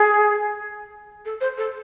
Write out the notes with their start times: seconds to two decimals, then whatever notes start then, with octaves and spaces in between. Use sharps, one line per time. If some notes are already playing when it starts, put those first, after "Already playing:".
Already playing: G#4
1.25 A4
1.40 C5
1.57 A4